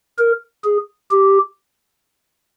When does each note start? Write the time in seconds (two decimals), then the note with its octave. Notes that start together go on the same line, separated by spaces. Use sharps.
0.18 A#4
0.64 G#4
1.11 G4